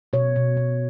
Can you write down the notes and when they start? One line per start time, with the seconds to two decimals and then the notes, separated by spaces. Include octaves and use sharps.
0.13 B2 C#5
0.36 B2
0.57 B2